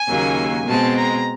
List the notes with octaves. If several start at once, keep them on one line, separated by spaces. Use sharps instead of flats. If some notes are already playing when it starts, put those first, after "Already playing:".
Already playing: G#5
D#2 C#3 F#3 A#3
B2 G#3 C4 A5
A#5